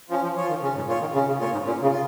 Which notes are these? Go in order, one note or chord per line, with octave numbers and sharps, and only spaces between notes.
F3 C#4
F3
F3 F4 C#5
D#3
C#3 C#4
G#2
A#2 F4 C#5
D#3
C#3 C#4
C#3
A#2 F4 C#5
G#2
A#2 C#4
C#3
F4